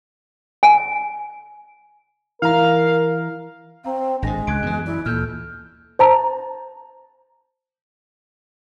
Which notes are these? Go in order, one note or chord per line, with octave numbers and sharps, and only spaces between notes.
G#5
E3 A#4 F5 A#5
C4 F5 A#5
G#1 A2 G#3 D4 A#6
C#2 F#6 G#6 D7
F#2 E3 B3
E4 D5
D2 A#2 E3 A#3 A4 F6 G6
C5 A5 A#5